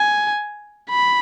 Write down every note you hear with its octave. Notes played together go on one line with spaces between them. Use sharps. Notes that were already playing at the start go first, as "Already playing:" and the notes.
Already playing: G#5
B5